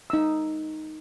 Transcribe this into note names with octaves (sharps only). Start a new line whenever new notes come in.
D#4 E6